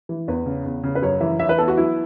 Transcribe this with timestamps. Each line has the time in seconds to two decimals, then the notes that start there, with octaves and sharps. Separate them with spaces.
0.09 E3
0.28 E2 B4
0.46 C#3
0.65 E2
0.84 C#3
0.95 B4
1.02 F#2 C#5
1.20 E3 E5
1.39 E3 E5
1.49 B4
1.58 B3 A4
1.68 F#4
1.77 F#3 E4